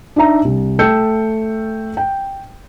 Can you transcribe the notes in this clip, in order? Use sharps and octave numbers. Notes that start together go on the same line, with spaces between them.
D4 D#4 E5 A#5
C2
A3 G5 A5 E6 G6 C#7
G5